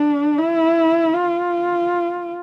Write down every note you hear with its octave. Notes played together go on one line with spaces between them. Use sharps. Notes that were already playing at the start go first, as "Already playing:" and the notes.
Already playing: D4
E4
F4